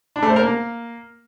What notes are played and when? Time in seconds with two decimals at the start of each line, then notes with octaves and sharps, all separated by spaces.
0.16 D4
0.23 A3
0.29 C5
0.36 A#4
0.43 A#3